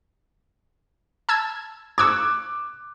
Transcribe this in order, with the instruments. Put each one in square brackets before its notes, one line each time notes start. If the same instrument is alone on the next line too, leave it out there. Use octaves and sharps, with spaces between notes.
[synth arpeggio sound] A5 E6 G#6
[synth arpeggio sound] C#6 E6 G#6 [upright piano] D6 F#6